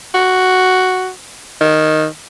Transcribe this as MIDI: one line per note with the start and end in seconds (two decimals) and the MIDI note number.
0.14 1.09 66
1.61 2.05 51